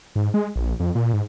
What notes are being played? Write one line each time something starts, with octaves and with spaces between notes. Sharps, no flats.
G#2
G#3
A#1
F2
A#2
G#2